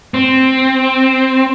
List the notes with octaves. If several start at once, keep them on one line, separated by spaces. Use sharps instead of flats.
C4